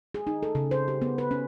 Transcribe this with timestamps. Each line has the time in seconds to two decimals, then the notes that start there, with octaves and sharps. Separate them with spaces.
0.14 G#4
0.27 D#4
0.43 A4
0.55 C#3
0.71 C5
0.88 G4
1.02 B3
1.18 B4
1.31 C#4